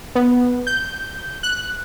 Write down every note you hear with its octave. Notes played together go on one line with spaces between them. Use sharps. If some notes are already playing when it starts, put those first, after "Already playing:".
B3
G6
F#6